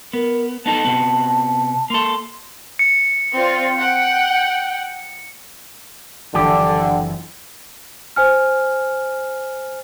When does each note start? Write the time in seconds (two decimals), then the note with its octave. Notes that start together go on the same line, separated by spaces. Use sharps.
0.13 B3 A#4
0.66 B3 D#4 A4 A5
0.85 C3 B3
1.90 A#3 A4 C6
2.79 C#7
3.35 C4 F4 D5
3.77 F#5 G5
6.35 F#1 D3 E3 F3 G4
8.16 C5 G#5 F6